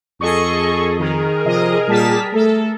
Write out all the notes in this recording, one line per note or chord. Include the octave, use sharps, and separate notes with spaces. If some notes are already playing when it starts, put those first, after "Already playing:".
F2 G#4 A4 D#5 C#6
D#3 G#4 A#4
C3 F3 D#5
A#2 G3 A5 B6
A3 A4